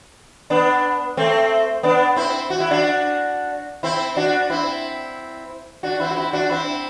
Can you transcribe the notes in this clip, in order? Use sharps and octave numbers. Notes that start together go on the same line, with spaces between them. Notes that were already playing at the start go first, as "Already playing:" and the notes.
B3 D4
A3 C4
B3 D4
C4 E4
F#4
E4
D4 F#4
C4 E4
D4 F#4
C4 E4
D4 F#4
C4 E4
F#4
C4 E4
D4 F#4
C4 E4